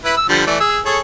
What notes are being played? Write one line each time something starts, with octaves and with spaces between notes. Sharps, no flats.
E4 B4
E6
D3 F3 G3
E3 A3 D5
G#4 E6
G#4 A4 C#5